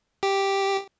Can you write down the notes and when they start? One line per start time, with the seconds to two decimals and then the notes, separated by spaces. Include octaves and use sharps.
0.23 G4